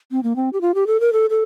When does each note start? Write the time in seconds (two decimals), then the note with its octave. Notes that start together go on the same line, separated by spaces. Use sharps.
0.11 C4
0.23 A#3
0.36 C4
0.53 G4
0.61 F4
0.75 G4
0.87 A4
1.00 A#4
1.13 A4
1.30 A4